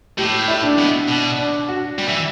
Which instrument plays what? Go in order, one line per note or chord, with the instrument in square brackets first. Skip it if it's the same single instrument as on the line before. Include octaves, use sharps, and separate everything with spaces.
[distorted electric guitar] A2 [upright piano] G4
[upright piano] E4
D4
[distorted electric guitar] B2
B2
[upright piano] D4
F#4
[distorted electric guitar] G3
E3